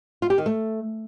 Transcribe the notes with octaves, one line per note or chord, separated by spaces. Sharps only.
F4
G4
D#3
A3